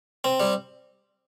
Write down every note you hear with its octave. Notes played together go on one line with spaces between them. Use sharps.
C4
G3